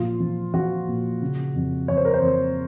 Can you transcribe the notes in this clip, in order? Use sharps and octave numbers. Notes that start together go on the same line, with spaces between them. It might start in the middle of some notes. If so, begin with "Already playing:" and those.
Already playing: A#2 F3 F4
F3
F3 F#4
A#2
C#3
F2
F2 C#5
C5
A#4
C5
F2